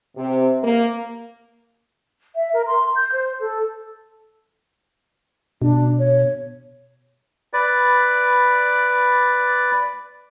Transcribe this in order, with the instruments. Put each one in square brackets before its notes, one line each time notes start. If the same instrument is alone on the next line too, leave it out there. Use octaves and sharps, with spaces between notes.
[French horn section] C3
A#3
[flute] E5
A#4
C6
G6
C5
A4
[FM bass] B2 [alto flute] D4
[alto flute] C#5
[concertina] B4 D5